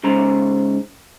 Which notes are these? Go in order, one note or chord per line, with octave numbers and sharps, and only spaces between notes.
G#2 C#3 C5 A#5